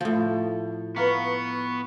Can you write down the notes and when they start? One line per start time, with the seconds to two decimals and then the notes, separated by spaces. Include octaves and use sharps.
0.01 A2 F3
0.96 B3 B4 F5 A#5 C#6